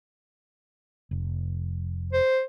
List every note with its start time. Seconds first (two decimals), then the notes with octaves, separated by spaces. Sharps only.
1.11 F1
2.13 C5